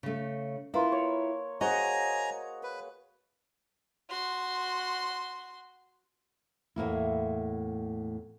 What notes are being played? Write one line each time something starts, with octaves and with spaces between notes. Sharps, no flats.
C#3 A3
A#3 E4 F4 B4 C6
C#5 C#6
F#4 G#4 C5 C#5 D#5 G#5 A#5
B4
F#4 C6
E2 A2 A#3 E4